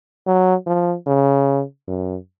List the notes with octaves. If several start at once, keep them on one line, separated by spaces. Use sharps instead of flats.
F#3
F3
C#3
F#2